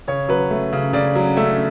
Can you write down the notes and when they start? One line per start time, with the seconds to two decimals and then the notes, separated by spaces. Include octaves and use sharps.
0.08 C#3 C#5
0.28 F#3 B4
0.51 A3
0.73 C#3
0.93 C#3 D5
1.15 F#3
1.37 A3 E5